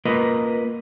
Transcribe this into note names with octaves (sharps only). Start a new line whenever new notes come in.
A#3 F4 A#4 B4 D#5